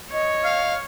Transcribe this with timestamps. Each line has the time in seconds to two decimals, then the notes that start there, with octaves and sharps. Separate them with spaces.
0.11 C#5 D#5
0.44 F5